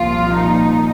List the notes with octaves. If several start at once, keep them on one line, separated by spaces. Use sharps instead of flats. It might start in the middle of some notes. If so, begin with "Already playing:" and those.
Already playing: C2 A#2 F3 F4
D#4